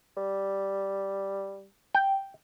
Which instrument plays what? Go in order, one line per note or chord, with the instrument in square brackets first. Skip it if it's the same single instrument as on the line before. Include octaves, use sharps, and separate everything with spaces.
[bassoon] G3
[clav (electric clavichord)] G5